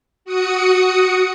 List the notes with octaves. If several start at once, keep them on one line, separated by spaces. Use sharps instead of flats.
F#4 D#6 C#7